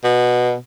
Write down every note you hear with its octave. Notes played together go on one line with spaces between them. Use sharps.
B2